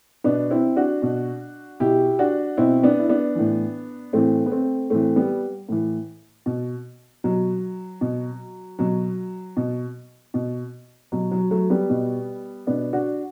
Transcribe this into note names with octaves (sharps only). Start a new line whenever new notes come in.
B2 B3 D4
C4 E4
D4 F#4
B2
B2 E4 G4
D4 F#4
B2 C4 E4
B3 D4
E4
B3 D4
A2 E3
A2 E3 A3 C4
B3
A3 C4
A2 E3 A3 C4
G3 B3
A2 E3
B2
B2 F#3
B2
B2 F#3
B2
B2
B2 F#3
F#3
F#3 A3
G3 B3
B2
B2 B3 D4
D4 F#4